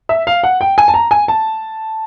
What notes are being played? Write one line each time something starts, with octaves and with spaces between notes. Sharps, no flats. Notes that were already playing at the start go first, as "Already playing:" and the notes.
E5
F5
F#5
G5
G#5
A5
A#5
G#5
A5